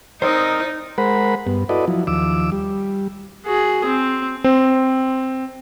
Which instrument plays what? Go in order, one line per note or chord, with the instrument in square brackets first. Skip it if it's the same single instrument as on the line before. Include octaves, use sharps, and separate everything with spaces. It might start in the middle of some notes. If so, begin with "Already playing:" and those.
[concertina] C4 A#4 D#5 [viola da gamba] D#4 [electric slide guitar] C5 D5
[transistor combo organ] G#3 A#4 C5 F#5 B5
G2 B3
E4 F#4 A4 B4 D5 D#5
F3 F#3 E4
D#2 F3 D6 E6
G3
[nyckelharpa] F#4 G#4
C4
[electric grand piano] C4